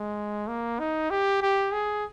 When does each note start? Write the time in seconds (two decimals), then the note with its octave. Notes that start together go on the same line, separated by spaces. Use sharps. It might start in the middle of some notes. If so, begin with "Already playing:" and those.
Already playing: G#3
0.48 A#3
0.80 D#4
1.10 G4
1.42 G4
1.72 G#4